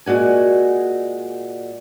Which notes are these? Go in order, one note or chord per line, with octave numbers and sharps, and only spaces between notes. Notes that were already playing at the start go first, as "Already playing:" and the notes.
A#2 G#3 F#4 G#5